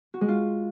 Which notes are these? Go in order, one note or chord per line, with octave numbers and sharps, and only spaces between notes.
F#4
G#3
F4